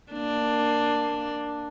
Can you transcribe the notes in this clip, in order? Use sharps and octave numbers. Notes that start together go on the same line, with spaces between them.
A#3 D4